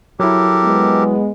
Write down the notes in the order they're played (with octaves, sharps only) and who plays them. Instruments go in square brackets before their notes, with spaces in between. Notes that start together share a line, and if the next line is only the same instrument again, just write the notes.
[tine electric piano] F#3 E4 [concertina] G4 A4 A#4
[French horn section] G#3 B3